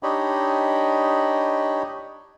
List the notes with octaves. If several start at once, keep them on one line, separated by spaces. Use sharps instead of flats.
D4 D#4 G4 C#5 D#5 B5